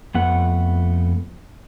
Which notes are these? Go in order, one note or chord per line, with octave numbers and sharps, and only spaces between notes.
F2 A3 B3 F#5